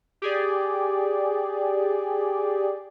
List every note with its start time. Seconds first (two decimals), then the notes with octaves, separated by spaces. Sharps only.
0.22 G4 G#4 D5